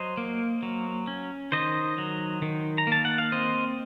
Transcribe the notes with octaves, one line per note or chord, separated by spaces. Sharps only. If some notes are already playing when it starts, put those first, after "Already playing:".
Already playing: F#3 C5 D#5
A#3
F#3
C#4
D#3 C5 D#5
F#3
D#3
A#5
A#3 A5
F#5
F5
C4 C5 D#5